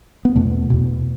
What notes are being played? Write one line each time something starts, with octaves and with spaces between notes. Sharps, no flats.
B3
E2 B2 A3
E2 B2